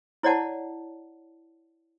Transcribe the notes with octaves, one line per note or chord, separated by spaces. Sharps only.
E4 C#5 D5 F#5 A5